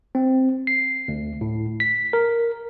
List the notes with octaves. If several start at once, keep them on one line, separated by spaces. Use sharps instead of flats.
C4
C7
D2
A2
B6
A#4